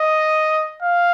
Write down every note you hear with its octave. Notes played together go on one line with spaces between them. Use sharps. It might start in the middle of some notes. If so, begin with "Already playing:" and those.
Already playing: D#5
F5